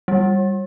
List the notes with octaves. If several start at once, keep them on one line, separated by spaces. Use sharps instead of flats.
G3